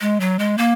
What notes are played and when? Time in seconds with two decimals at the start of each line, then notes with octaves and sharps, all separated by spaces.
0.01 G#3
0.20 F#3
0.39 G#3
0.58 A#3